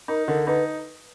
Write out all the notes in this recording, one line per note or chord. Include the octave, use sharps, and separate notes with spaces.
D#4 A#4
D3 A#4
D#4 B4